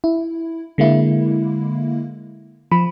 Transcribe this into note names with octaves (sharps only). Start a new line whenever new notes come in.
E4
D3 G#3 A#3 E4
F3 B5